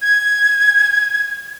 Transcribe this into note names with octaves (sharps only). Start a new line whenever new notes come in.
G#6